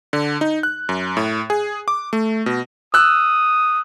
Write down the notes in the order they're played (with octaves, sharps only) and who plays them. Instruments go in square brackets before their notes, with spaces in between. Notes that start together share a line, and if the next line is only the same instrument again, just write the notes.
[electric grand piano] D3
D#4
F#6
F#2
A2
G#4
D6
A3
B2
[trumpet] D#6 [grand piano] E6 F#6